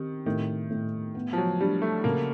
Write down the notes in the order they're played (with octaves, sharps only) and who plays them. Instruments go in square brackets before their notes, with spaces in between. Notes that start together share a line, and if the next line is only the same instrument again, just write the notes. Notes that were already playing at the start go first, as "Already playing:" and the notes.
Already playing: [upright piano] D#3 [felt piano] C4 G4
[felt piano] A2 [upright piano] D#3
[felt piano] A2
B3
[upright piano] F3
F#3
[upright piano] G3 [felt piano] D4
[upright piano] A3
[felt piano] C#3 [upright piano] A#3